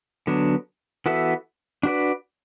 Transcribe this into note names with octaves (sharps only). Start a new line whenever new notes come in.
D3 F#3 B3 D4
E3 B3 F#4 A4 E5
D4 F#4 B4 D5